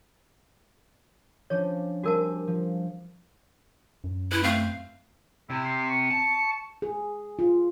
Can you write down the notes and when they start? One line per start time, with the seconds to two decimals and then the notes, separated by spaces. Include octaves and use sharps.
1.50 F3 C#4 D4 C#5
2.03 G3 C4 F#4 A#4 G#5 A5
2.47 F3
4.04 F#2
4.32 E4 B4
4.43 A3 C4 F5
5.50 C3 E4
5.65 C6
5.90 C#6
6.11 A5
6.82 G#4
7.39 F4